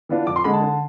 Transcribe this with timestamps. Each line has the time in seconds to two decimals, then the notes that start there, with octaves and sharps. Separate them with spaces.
0.09 E3 B3 D4 F4
0.27 F2 D6
0.36 C6
0.44 D3 G#3 B5
0.53 A5
0.62 D3